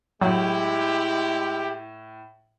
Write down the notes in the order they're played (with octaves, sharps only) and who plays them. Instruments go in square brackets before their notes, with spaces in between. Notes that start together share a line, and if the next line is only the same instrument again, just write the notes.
[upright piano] A2 [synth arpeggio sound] F#3 [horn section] G#3 E4 G4